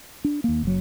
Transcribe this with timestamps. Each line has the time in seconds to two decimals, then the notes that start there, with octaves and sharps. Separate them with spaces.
0.24 D4
0.44 D#2 A#3
0.63 F#1 F#3